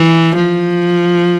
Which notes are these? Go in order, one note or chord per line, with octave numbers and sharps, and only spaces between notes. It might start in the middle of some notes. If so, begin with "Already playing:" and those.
Already playing: E3
F3